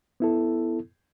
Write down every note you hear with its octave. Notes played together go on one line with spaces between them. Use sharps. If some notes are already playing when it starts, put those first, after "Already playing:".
B3 E4 A4